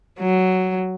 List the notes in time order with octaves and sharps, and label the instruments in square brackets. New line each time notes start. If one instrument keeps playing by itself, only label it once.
[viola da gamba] F#3